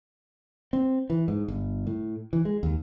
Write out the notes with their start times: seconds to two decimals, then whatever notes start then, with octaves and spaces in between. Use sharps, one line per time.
0.73 C4
1.10 E3
1.28 G#2
1.48 G1
1.87 A2
2.33 E3
2.45 G#3
2.63 D#2